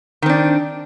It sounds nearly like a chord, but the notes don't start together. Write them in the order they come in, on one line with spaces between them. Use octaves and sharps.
D#3 C4 D4